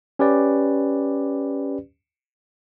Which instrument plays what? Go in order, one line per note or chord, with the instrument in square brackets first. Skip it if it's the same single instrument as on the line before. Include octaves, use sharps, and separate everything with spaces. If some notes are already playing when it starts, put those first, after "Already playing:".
[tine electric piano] C#4 G4 B4 D5